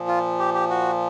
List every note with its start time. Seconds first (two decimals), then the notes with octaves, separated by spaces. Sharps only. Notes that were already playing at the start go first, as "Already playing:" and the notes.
Already playing: A#2 F3
0.08 F4
0.40 G4
0.54 G4
0.70 F#4